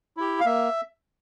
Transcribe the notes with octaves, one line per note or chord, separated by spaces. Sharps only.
E4 G4
F5
A#3 E5